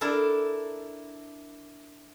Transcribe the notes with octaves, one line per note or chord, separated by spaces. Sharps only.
D4 E4 A4 A#4